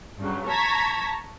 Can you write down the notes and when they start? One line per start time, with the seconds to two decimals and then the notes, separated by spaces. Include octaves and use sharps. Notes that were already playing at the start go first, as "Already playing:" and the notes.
0.20 G2 C#3 F#3
0.49 A5 A#5 C#6 G#6 A#6 B6